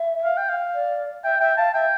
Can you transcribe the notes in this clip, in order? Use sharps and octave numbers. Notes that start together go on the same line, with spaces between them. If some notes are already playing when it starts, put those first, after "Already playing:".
Already playing: E5
F5
G5
F5
D5
E5 G5
E5 G5
F5 A5
E5 G5